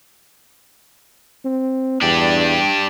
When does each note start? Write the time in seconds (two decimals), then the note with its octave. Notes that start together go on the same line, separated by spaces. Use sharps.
1.45 C4
2.02 E2 D4 G4